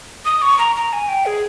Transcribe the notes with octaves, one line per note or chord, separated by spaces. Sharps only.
D#6
C#6
A#5
A#5
G#5
G5
G#4